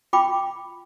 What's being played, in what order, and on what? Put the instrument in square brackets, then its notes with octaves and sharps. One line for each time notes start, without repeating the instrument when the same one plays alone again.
[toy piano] F4 G5 B5 D6